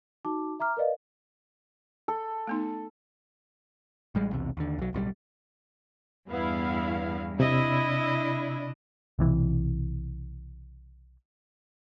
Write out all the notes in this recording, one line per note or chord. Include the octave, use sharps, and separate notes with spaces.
D#4 F#4 A5 D6
E5 A#5 D6 F6
A#4 B4 D5 D#5 F5
A4
A3 B3 D#4
A1 G3 G#3
B1 E2 C3
D#2 D3
B1 F#3
D1 B1 A2 G3
E2 G2 B3 E4 F5
C3 D4 E4 D#5
B1 C3 E3